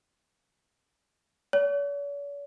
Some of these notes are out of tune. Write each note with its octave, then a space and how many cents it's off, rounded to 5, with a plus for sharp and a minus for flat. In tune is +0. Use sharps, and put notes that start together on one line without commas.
C#5 +45